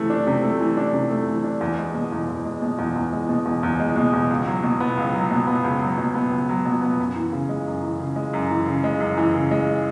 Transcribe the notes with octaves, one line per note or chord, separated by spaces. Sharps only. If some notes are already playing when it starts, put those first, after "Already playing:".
Already playing: C3 E3 A3
D4
C3
A3
E3
D4
C3
A3
E3
D4
E2
G#3
B2
E2
E2
G#3
B2
E2
E2
G#3
B2
E2
E2
G#3
B2
E2
C#2
F#3
B2
B3
C#2
F#3
B2
B3
C#2
F#3
B2
B3
C#2
F#3
B2
B3
F#2
E3
C#3
G#3
F#2
E3
C#3
G#3
F#2
E3
C#3
G#3
F#2
E3
C#3
G#3